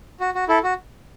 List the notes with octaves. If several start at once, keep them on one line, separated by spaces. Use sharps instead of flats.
F#4
F#4
E4 A4
F#4